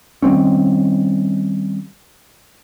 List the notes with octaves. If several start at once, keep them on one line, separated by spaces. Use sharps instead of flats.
D#3 G3 C4 C#4